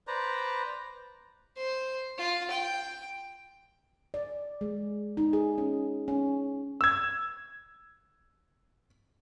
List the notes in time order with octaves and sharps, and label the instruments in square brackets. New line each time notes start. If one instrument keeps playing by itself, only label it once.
[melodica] B4 C5 D5 A#5
[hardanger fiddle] C5
F4
G5
[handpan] D5
G#3
D#4
G#4
C#4
C#4
[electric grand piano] E6 G#6